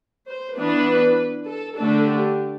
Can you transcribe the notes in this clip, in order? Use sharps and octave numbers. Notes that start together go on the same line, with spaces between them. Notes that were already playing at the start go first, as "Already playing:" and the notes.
C5
E3 B3 D4 B4
A4
D3 A3 D4 A4
G4